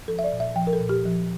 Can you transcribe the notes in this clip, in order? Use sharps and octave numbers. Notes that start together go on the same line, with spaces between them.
F3 A4
E5
D5
A#2
E5
F3 G5
A#4
A4
A#2
G4
F3